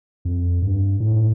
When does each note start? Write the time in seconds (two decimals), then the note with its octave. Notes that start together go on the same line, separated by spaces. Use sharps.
0.25 F2
0.62 G2
1.00 A2